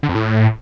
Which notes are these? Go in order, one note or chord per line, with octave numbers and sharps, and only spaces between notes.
D3
F2
A2